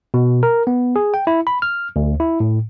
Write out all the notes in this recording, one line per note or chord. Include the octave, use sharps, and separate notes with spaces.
B2
A#4
B3
G#4
G5
E4
B5
F6
D2
E4
A2